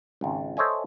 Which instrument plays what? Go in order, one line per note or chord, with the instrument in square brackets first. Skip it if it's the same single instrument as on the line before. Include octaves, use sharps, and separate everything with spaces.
[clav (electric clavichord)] G#1 C#2
A4 C5 C#5 D#5 E5 G#5